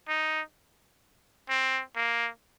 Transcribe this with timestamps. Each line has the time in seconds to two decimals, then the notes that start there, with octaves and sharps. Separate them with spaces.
0.08 D#4
1.49 C4
1.96 A#3